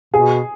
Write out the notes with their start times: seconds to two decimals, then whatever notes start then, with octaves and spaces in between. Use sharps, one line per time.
0.14 B2 G#4